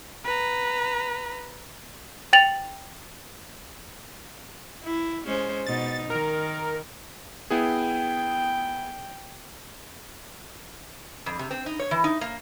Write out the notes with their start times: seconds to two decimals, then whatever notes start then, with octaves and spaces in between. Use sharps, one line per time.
0.24 B4 A#5
2.33 G5 A6 F7 F#7
4.84 E4
5.26 G#3 C#4 C5
5.67 B2 D#4 A6
6.10 D#3 A#4
7.50 B3 E4 G#4 G5
11.26 F2
11.39 C3
11.51 C4
11.66 D#4
11.79 C#5
11.91 E3
12.04 D#4
12.21 A#3